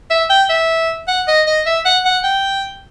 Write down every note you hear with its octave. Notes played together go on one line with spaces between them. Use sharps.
E5
G5
E5
F#5
D#5
D#5
E5
F#5
F#5
G5